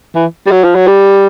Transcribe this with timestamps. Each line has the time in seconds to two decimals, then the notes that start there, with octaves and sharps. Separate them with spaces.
0.15 E3
0.47 G3
0.52 F#3
0.64 F3
0.75 F#3
0.87 G3